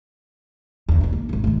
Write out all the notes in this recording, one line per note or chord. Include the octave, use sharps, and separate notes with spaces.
E2 D3
D1 D#2
A#3
G#1 F2
A2 D#3